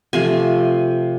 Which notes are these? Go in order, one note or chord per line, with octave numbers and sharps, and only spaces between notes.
C3 F3 A3 G#5